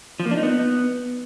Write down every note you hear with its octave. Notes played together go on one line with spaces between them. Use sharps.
F3
A#3
D4
D#4
B3